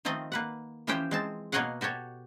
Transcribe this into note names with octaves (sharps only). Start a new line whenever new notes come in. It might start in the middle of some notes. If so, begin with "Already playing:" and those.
D#3 F3 A3 C4 D#5
A#3 B4 F#5
E3 F3 C#4 G4 C5 G5
G#3 C4 A5
B2 A#3 C#5 D#5 F5 F#5
F#4 G4 A4 C#5